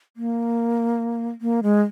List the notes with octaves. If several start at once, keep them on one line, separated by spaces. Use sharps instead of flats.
A#3
A#3
G#3